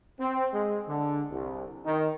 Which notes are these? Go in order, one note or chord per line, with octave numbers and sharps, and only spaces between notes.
C4
G#3
D3
C2
D#3